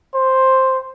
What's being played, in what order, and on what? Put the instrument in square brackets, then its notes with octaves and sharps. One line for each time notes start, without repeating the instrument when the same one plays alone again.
[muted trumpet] C5